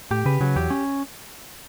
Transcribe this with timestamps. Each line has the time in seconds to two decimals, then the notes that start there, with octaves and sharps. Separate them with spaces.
0.11 A2 G4
0.25 C#3 B4
0.40 C#3 F#3
0.56 E2 G4
0.70 C#4